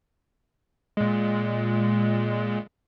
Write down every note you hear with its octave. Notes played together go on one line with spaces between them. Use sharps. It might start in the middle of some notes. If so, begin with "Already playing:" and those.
A#2 G#3